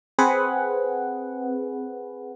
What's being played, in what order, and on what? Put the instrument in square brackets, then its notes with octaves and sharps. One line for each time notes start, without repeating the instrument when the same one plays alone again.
[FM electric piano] C4 G#4 B4 F#5